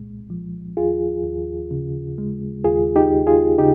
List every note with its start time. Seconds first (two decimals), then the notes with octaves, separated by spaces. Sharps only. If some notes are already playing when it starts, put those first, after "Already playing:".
Already playing: C2 A#2 G#3
0.30 F3
0.77 D#2 F4 G#4
1.24 D#2
1.71 C#3
2.18 G#3
2.64 D#2 F4 G#4
2.96 D#4 G4
3.12 D#2
3.27 F4 G#4
3.58 C#3 D#4 G4